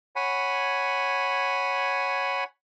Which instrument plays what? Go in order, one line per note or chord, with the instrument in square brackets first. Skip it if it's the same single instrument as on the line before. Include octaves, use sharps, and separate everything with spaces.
[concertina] C#5 F#5 G#5 B5